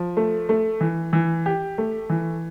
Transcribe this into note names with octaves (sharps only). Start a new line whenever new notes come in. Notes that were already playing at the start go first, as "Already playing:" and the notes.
Already playing: F3
A3
A3
E3
E3
G4
A3
E3